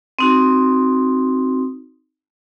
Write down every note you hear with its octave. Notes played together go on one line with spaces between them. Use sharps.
C4 D#4 F#4